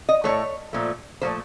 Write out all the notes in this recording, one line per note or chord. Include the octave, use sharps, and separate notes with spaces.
D#5
A2 F#3 A3 C#5
A#2 F3 A3
A#2 F3 A3 C5